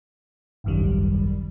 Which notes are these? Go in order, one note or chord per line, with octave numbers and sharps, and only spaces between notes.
G#1 C#2 F#2 D#3 G3